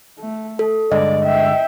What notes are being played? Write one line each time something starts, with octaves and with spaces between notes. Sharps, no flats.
A3
A4
G2 D3 G#3 D5 D#5
E5 G5